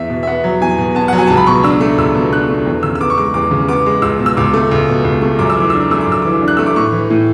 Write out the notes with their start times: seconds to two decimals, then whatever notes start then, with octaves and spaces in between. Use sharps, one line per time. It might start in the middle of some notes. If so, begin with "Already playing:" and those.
Already playing: E2 E5
0.10 B2
0.23 E5
0.27 B3 F#5
0.44 F#3
0.61 E2 G#5
0.78 B2
0.95 B3 A5
1.08 F#3 F#5
1.18 G#5
1.27 C#2 A5
1.37 B5
1.47 B2 C#6
1.63 D4 E6
1.81 A3
1.98 C#2 E6
2.15 B2
2.32 D4 F#6
2.49 A3
2.66 E2
2.83 C#3 E6
2.95 E6
3.01 B3 D6
3.10 C#6
3.18 G#3 D6
3.34 E2 D6
3.51 C#3
3.69 B3 D6
3.86 G#3
4.02 C#2 E6
4.19 B2
4.26 E6
4.37 C#2 D6
4.53 A3
4.71 C#2
4.89 B2
5.05 C#2
5.22 A3
5.39 F#2 D6
5.50 E6
5.57 E3 D6
5.70 D4 E6
5.80 D6
5.90 A3 E6
6.01 D6
6.07 F#2 E6
6.22 E3 D6
6.42 D4
6.48 F#6
6.57 A3 E6
6.66 D6
6.76 A2 C#6
6.92 E3
7.10 A2